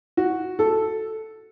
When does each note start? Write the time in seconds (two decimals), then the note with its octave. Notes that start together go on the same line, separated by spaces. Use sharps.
0.17 F#4
0.59 A4